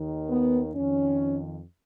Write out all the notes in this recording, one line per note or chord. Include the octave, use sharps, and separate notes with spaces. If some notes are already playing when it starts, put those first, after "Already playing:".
Already playing: D#2 D#3
B3
F2 D#3 C#4